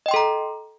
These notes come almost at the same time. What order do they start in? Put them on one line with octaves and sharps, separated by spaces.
D#5 G5 C6 A4 A#5